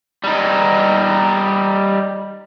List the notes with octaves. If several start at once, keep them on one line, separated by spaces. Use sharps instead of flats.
G3 D#4